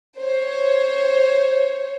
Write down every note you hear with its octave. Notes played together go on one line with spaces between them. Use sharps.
C5 C#5